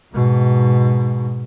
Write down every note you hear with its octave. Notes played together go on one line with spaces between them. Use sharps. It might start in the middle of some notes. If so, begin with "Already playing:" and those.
G#2 B2